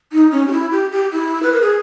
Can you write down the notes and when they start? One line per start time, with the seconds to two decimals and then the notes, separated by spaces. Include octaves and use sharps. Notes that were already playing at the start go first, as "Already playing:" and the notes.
0.12 D#4
0.31 C#4
0.47 G4
0.51 E4
0.71 G4
0.92 G4
1.11 E4
1.42 B4
1.52 A#4
1.61 G#4